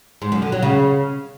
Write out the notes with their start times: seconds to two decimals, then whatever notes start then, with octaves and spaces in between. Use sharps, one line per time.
0.22 G#2
0.32 F#2
0.42 D3
0.52 F#3
0.62 C#3